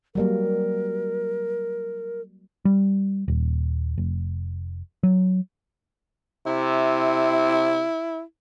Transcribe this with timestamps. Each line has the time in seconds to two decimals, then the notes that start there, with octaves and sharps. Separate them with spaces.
0.15 F#3 G3 A#3 A#4
2.65 G3
3.28 D#1
3.98 F1
5.03 F#3
6.46 C3 E4